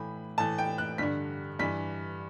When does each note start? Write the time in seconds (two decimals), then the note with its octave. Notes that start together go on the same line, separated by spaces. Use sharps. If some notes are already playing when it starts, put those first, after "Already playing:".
Already playing: A2 E3 B5
0.38 A2 E3 A5
0.58 G5
0.78 F#6
0.98 G2 D3 B6
1.59 G2 E3 B6